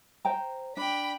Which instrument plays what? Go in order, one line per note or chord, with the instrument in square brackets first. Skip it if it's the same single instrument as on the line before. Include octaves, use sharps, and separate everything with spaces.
[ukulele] C5 G5 A#5
[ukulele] D4 [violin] G5 B5